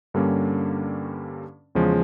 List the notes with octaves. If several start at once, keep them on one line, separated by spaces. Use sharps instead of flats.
G2 D3 G3 A#3 C#4
E2 C#3 F3 G#3 C#4